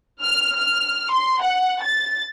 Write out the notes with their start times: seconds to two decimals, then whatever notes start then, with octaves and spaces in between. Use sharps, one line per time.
0.23 F6
0.58 F6
1.12 C6
1.42 F#5
1.83 A6